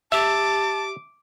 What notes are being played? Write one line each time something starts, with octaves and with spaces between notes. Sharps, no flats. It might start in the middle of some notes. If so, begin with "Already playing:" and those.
G4 E5 A5 D6